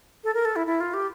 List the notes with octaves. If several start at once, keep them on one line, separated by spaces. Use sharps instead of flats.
A4
A#4
A4
E4
E4
F4
G4